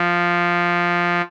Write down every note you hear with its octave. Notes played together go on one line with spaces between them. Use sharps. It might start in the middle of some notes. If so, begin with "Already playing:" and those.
Already playing: F3